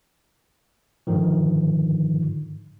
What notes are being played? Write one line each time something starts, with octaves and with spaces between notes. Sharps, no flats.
G#2 D3 D#3 F3